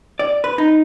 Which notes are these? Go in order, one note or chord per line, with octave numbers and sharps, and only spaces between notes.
D5
B4
D#4